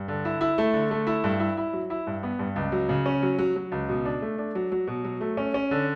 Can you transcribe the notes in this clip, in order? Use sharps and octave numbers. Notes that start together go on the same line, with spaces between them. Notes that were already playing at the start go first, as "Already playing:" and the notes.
Already playing: G2
D3
E4
E4
A3
D3
A3
E4
G2
E4
E4
F#3
E4
G2
B3
G2
C#2
F#3
C#3
C#4
F#3
F#3
F#3
C#2
B2
D4
A3
D4
F#3
F#3
B2
F#3
A3
C#4
C#4
D3